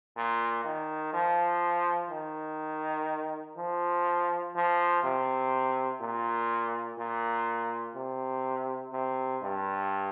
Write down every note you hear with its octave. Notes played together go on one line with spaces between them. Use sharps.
A#2
D#3
F3
D#3
F3
F3
C3
A#2
A#2
C3
C3
G2